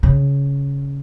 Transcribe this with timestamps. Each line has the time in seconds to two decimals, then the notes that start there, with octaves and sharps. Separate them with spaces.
0.03 C#3